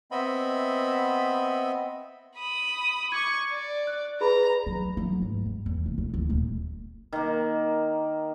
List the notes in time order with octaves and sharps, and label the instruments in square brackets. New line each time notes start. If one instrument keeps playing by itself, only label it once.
[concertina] B3 C4 D#5 E5 B5
[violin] B5 D#6
[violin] C#6 [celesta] D6 G#6
[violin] D5
[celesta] F#6
[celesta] G#4 B4 B5 [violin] A#5
[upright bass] F#3
F#3
G#2
G3
E2
E1
E3
D2
D#1
[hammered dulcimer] D#3 A#3